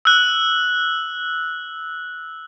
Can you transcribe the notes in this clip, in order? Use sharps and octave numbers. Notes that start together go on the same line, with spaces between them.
E6 F#6